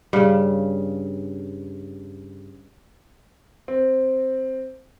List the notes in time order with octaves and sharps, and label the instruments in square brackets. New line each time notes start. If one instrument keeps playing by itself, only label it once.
[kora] G2 C#3
[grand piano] C4